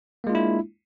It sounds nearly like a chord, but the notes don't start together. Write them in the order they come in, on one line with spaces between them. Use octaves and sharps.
A#3 G#3 F4 D4 E4